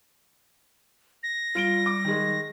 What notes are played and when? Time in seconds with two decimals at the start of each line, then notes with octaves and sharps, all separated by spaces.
1.23 A#6
1.55 G3 F4 D7 G7
1.86 D6
2.05 D#3 G#3